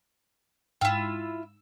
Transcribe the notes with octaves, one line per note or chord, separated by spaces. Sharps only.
G#2 E4 F4 G5 E6